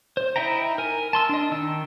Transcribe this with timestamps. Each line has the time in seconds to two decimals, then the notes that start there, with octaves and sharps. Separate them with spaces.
0.17 C5
0.36 D#4 E4 E5 G5 A#5
0.78 A#4 G#5
1.13 A5 C6 E6
1.29 D4 D#5
1.52 D#3 E6